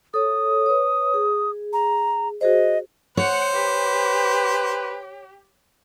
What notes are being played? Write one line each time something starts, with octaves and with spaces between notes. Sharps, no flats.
A4 C#5 D#6
B4 C#5
G#4
A#5
F#4 G#4 C5 D#5
C5 C#5 F#5
G4 B4